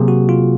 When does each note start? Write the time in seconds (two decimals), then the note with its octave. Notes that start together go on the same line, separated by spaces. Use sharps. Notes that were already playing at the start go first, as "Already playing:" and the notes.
Already playing: C3 F#3 A#3 G#4
0.08 F#4
0.29 F4